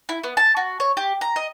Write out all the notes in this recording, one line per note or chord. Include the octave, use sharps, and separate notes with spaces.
E4
B3
A5
F#4
C#5
G4
A#5
D#5